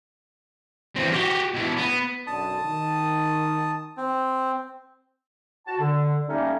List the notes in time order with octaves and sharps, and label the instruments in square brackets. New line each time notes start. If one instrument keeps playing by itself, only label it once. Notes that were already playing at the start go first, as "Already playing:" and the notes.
[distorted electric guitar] E3 C4
F#4 G4
B2 E3
B3
[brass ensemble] B1 F#2 D3 [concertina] A5 D#6
[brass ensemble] D#3
[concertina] C4
[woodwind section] F#4 A5
D3
G3 A3 A#3 C#4 D#4